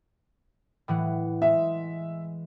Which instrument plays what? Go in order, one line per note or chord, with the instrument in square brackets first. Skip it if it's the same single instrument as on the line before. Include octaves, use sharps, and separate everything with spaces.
[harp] A2 E3 F#5
[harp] G#3 [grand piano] E5